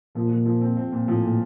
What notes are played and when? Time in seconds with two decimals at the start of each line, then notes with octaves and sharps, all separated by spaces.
0.15 A#2 F3
0.30 F3
0.46 F3
0.61 C4
0.77 C4
0.92 A#2
1.07 A2 F3
1.23 A#2